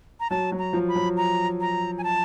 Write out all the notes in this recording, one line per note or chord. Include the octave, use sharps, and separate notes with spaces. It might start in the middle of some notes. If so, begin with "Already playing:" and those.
A#5
F#3 A5
F#3
A#5
F3
B5
F#3
A#5
A#5
G#5
A5